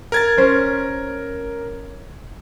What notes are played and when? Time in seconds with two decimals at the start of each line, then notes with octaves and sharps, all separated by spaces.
0.12 A#4 G#6 A6
0.38 C#4 C5